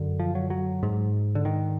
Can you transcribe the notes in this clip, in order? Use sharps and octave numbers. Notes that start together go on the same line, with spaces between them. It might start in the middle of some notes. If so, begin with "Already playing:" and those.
Already playing: F#2 D3
F3
F#3
F#3
G#2
D3
D#3